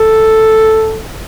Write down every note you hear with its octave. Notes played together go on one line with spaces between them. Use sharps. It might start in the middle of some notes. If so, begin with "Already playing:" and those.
Already playing: A4